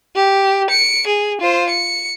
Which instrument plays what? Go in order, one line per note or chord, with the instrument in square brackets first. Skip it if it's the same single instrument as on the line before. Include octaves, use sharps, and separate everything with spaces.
[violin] G4
C#7 D7
G#4
F4 C5
C#7